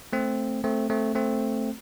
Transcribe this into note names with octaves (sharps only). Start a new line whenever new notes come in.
A3 C4
A3 C4
A3 C4
A3 C4